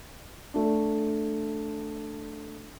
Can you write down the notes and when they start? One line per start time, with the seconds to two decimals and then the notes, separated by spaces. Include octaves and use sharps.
0.54 A3 D4